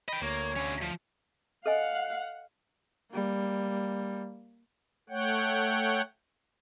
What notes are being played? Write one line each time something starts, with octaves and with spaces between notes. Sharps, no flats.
D#5 G5 B5
D2 A#3 C#5
D3 C#4
F3
A4 D#5 F5 F#5 G#5
G3 A#3
A3 C#5 F#5 G5